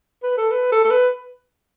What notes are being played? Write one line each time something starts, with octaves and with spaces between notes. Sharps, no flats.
B4
A4
B4
A4
A4
B4